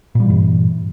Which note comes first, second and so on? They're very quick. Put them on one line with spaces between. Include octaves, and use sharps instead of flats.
A#2 G3 E3 G2